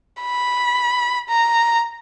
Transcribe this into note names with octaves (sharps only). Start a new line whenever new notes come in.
B5
A#5